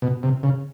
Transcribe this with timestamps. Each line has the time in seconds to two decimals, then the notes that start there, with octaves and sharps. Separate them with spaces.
0.02 B2
0.23 C3
0.43 C#3